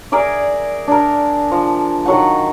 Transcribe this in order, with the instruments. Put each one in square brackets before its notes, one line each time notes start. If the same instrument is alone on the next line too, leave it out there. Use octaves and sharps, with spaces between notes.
[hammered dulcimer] G#4 A#4 D5 E5
D4 A#4
F3
D#3 F#3 F#5